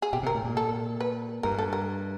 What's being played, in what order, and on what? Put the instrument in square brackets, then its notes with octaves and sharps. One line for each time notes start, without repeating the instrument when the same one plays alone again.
[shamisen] G#4
[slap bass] B2 [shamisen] G4
[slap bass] C3 [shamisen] A#4
[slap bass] A2
A#2
[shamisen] A4
B4
[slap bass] G2 [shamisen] A#4
[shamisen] A4
A#4